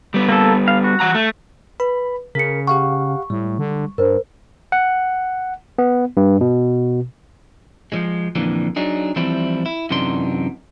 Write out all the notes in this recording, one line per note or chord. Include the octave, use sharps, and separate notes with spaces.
G3 B3
A#3 A4
F5
F#4
E3 F#5 A#5
A3
B4 B5
C#3 A#4 B6 C#7
G4 F5 F#5 C#6
A2 G3
D3
G2 A#4 C5
F#5
B3
G2
B2
F3 F#3 G#3
F2 A#2 D3 E3
F#3 D4 D#4 G#4
E3 F3 G3 C4 E4
E4
F#2 C3 E3 D4 D#4 C6